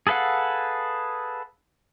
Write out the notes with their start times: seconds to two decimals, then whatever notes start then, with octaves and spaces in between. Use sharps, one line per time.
0.07 G#4 A4 B4 F5 F#5